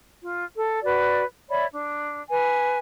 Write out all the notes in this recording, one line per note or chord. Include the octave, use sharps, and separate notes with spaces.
F4
A4
F#4 B4 D5
C#5 D5 E5 B5
D4
B4 G#5